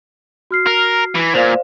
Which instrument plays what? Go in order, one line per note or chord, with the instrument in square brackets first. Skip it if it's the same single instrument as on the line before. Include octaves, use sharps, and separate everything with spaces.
[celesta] F#4 F6 C7
[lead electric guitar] A#4
E3
[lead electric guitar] A#2 [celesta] C5 D5 F5